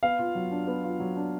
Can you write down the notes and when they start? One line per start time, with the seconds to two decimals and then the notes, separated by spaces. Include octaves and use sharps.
0.03 B3 F5
0.19 F4
0.35 F#3
0.51 D4
0.67 B3
0.84 F4
1.00 F#3
1.17 D4